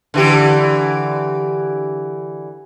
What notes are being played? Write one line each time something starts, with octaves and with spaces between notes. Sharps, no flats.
D3 E3 G4